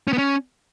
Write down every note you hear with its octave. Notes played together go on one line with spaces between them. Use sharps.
C#4
B3
C#4